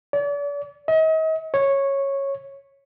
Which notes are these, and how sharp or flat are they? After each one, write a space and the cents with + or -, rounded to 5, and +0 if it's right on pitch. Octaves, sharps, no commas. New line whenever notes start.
D5 -40
D#5 +40
C#5 -10